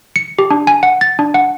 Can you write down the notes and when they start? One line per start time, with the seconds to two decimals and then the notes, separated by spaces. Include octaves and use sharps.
0.16 C#7
0.39 G4
0.51 D4
0.67 G#5
0.83 F#5
1.01 A6
1.19 D4
1.34 F#5